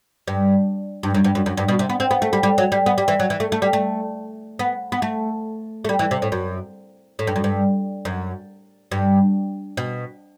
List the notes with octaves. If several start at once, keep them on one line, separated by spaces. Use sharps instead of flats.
G2
G2
F#2
G2
F#2
F#2
G2
B2
C3
B3
C4
B3
A3
G3
G3
F#3
G3
B3
G3
E3
F#3
E3
A3
A3
G3
A3
B3
B3
A3
A3
G3
E3
C3
A2
F#2
A2
G2
F#2
G2
F#2
G2
B2